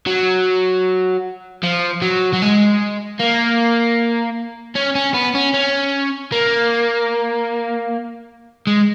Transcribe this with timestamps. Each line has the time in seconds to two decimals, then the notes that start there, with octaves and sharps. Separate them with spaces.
0.07 F#3
1.63 F3
2.02 F#3
2.33 F#3
2.42 G#3
3.20 A#3
4.75 C#4
4.95 C#4
5.14 B3
5.35 C#4
5.54 C#4
6.32 A#3
8.67 G#3